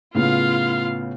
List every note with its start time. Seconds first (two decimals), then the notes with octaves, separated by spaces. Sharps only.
0.15 A2 C#3 B3 F4 F5